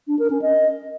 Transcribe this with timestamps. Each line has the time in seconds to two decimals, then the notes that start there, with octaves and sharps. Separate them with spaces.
0.08 D4
0.19 A#4
0.30 C#4
0.42 D#5